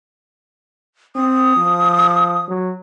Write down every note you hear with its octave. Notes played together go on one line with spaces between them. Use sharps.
C4 D#6
F3
F#3